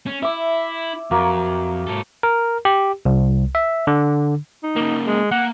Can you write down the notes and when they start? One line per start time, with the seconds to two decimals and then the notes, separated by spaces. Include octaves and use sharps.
0.07 C#4
0.23 E4 E5 D6
1.11 F2 F#3 A#3
1.87 G#2 A4
2.23 A#4
2.65 G4
3.05 C2
3.55 E5
3.87 D3
4.63 D#4
4.76 C#3 A#3
5.06 G#3
5.31 A#3 F#5